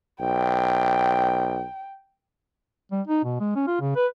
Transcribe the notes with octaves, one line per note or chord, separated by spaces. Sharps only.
B1 G5
G3
D#4
B2
G#3
C#4
F4
C#3
B4